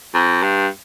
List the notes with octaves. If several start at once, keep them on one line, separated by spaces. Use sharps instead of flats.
F2
G2